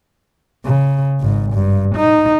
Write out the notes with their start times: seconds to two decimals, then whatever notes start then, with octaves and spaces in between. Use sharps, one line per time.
0.65 C#3
1.21 G#1 G#2
1.53 G2
1.96 D#4